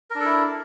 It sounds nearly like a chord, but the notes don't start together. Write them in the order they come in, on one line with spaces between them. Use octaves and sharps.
A#4 D4 A4 E4